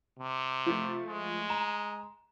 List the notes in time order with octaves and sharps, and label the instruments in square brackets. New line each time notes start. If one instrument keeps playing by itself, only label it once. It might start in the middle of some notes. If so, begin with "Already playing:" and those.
[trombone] C3
[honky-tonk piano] F3 A3
[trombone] G#3
[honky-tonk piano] A#5 E7